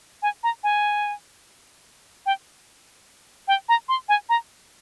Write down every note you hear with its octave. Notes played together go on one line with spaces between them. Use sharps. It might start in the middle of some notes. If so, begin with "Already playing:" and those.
G#5
A#5
G#5
G5
G5
A#5
C6
G#5
A#5